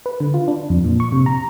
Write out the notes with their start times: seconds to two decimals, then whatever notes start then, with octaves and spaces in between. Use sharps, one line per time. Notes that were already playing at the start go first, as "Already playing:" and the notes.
0.06 B4
0.20 D3
0.34 F4
0.48 D4
0.70 F2
0.84 A#2
1.00 C#6
1.12 C3
1.26 A#5